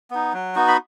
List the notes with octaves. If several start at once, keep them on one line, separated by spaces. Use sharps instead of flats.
B3 D#4
F#3
B3 D#4 F#4
B5